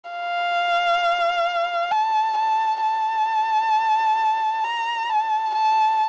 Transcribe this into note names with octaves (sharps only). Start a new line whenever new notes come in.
F5
A5
A5
A5
A#5
A5
A5